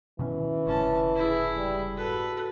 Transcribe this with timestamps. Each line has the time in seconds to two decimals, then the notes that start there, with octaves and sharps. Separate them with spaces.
0.19 B2 D#3 E3 C#4
0.66 F1 G#2 C#3 C#4 A5
1.16 E4 G#4
1.56 G3
1.97 F#4 A4 B4